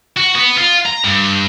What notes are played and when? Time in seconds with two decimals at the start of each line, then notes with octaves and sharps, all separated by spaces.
0.16 F#4
0.35 B3
0.58 F4
0.86 A#5
1.05 G2